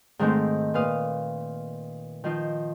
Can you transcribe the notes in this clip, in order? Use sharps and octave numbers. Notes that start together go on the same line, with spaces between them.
G#2 D#3 G#3 A3 C4
A#2 B4 F5 D#6
D#3 F3 F4